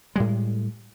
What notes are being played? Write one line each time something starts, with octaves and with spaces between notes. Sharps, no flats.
A2 G3 G#3